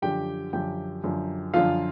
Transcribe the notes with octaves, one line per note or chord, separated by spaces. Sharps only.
F#2 D3 F3 G4 G5
F#2 D3 F3 G4 G5
F#2 D3 F3
F#2 D3 F3 F4 F5